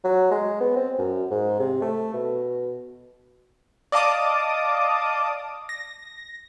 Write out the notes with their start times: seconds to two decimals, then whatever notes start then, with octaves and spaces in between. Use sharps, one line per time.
0.04 F#3
0.31 G#3
0.61 B3
0.76 C4
0.99 F#2
1.30 G#2
1.59 C3
1.82 A3
2.13 B2
3.92 D5 D#5 F5 A5 D6 D#6
5.69 A#6